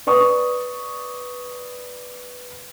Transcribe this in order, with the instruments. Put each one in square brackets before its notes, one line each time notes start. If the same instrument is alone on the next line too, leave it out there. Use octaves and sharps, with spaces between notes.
[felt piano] B4 D5 C#6 D#6